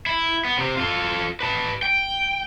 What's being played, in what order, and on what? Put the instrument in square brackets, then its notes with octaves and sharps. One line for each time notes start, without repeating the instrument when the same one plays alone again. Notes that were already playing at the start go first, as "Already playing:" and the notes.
[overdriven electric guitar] E4
B3
C3 C4
F4 A4
B4 A5
G5